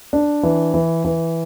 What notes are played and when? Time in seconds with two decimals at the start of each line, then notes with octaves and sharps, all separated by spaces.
0.13 D4
0.43 E3
0.74 E3
1.05 E3